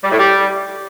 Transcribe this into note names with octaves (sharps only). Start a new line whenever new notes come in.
G3
A2
G3